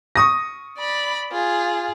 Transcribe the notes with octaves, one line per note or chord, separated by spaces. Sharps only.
C#6 D#6 A#6
D5 B5
F4 G#4